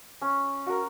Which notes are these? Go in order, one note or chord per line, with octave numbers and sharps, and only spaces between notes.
C#4
F#4 A#4